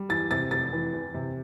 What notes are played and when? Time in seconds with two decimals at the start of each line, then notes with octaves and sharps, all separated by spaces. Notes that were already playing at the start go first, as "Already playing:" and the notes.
Already playing: G3
0.09 E2 A6
0.31 C3 A6
0.51 F1 A6
0.73 E3
0.93 E2
1.14 C3